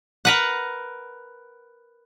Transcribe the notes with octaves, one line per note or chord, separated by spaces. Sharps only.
A#4 B4 F#5